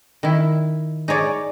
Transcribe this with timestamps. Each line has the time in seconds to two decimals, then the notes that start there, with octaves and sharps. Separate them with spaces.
0.23 D#3 E4
1.08 D#4 G#4 C#5 D5